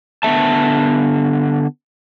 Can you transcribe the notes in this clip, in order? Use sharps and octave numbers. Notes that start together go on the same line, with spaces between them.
D3 B3 A#4 E5 A5